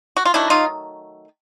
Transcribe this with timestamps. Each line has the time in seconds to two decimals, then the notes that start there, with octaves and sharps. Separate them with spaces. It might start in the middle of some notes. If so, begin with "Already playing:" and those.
0.17 F#4
0.25 F4
0.34 D#3 F#3 A3 D4 E4
0.50 D#4 F4